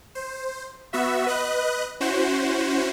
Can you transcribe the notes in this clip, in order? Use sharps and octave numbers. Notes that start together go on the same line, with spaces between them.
C5
B3 F#4 E5
B4 D#5 F#6
C#4 E4 F#4 C5